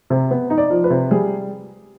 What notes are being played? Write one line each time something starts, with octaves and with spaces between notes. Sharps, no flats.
C3
B3
D#4
D5
F3
B4
C3
G3 G#4